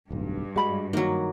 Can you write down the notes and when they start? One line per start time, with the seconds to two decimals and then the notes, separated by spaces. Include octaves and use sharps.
0.11 D1 B1 G2
0.56 G#3 F#4 B5
0.93 D#3 F#3 A#3